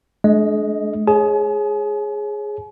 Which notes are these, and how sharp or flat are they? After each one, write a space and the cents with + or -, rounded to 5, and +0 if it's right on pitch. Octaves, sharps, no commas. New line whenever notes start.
G#3 +45 D4 +0 D#5 +0
G#4 +0 C#5 -25 G#5 +40